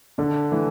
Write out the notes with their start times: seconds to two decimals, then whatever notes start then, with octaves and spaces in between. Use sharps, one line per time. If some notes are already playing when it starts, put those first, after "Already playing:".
0.18 D3 D4
0.52 E3 A3